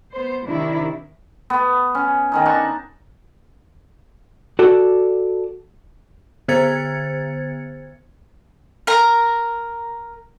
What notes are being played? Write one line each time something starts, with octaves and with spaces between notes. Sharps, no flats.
B3 C5
C3 D#3 D4 E4
B3
C#4
D#3 C#4 D#4
D4 D#4 A5 C#6
F#4 A4 D5
D3 B3 C5 G#6 A6 C#7
A#4 A#5